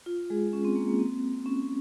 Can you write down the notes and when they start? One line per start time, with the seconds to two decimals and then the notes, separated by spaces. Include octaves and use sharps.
0.06 F4
0.30 G#3 G#4
0.53 C#4
0.65 C4
0.76 A#3
0.88 A#3
0.99 C4
1.46 C#4